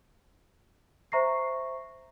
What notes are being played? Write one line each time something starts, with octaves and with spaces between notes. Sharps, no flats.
C5 E5 A#5 C#6 A#6 C7